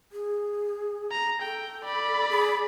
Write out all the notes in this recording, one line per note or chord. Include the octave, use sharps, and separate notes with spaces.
G#4
A#5
A4 G5
D5 B5
G#4